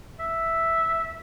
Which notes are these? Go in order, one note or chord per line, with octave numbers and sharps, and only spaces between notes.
E5